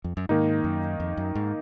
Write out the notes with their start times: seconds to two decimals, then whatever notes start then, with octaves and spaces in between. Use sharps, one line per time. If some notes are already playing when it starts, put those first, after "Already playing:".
0.04 F2
0.17 F#2
0.29 G#2 D#3 A#3 D#4
0.64 F#2
1.00 F2
1.17 F#2
1.35 G#2